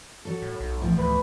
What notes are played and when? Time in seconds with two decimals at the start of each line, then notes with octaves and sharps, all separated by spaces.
0.25 F#3 A4
0.42 A2
0.60 B1
0.81 E2 A2 F3
0.98 D2 B4